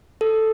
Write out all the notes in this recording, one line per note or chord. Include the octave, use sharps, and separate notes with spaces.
A4